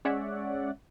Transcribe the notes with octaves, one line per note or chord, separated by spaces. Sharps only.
G#3 C#4 C#5 D5 E5 F#5